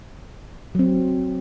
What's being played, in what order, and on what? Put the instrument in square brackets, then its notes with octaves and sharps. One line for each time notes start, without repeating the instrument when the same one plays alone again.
[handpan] F#3 C4